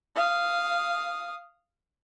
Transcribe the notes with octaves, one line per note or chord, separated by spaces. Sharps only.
F5 D#6